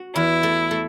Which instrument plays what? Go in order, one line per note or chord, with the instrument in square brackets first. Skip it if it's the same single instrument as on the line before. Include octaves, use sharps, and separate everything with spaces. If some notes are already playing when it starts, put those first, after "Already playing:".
Already playing: [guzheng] F#4
[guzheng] E2 [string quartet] E4
[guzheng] A3
A3